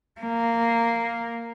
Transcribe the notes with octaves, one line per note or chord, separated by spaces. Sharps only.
A#3